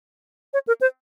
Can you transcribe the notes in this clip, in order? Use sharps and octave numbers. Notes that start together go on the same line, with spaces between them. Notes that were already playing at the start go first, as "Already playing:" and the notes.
C#5
A#4
C5